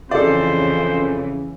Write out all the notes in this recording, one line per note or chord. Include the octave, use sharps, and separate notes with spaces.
F2 C#3 E3 A4 C5 D5